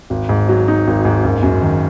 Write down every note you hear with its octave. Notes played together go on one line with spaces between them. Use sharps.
G#1
G#2
F#3
D#4
G#1
G#2
F#1
F#2
D#3